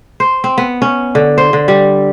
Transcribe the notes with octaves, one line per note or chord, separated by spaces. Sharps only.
C5
C4
B3
C#4
D3
C5
D3
G3